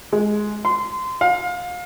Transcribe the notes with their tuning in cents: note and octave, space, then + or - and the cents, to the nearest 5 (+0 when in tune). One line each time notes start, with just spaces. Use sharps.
G#3 +10
C6 -20
F5 +30